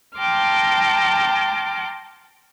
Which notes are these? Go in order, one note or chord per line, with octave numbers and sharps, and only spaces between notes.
G5 A5 A#5 C6 D6 F6